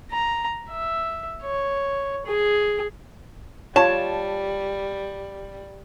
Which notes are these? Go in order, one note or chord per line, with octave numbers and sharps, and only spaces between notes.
A#5
E5
C#5
G#4
G3 F4 C#5 A5